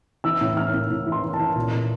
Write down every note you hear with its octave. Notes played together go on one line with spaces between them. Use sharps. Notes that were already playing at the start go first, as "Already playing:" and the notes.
E3 E6
A2
E3 F6
A2
A2
E3
C6
E3
A5
E3
A#2
A#2